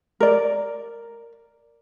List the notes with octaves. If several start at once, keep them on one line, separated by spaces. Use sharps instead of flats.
A#4 D5